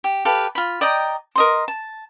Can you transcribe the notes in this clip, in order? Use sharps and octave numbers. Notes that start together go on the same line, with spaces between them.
G4
G4 A4 B4 F5
F4 B5
D5 D#5 G5 A#5
A#4 D#5 C6
A5